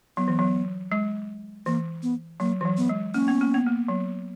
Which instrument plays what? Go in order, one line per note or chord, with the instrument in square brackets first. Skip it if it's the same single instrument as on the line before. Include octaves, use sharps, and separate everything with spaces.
[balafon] F#3 [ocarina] B3
[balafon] E3
F#3
G#3
[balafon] E3 [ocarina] A#3
[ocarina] B3
[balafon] F#3 [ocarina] A#3
[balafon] E3
F#3
[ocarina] B3
[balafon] G#3
[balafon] A#3 [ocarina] C#4
[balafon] B3
A#3
B3
A#3
F#3